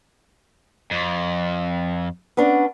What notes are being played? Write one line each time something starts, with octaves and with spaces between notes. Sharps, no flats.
F2
B3 C#4 D4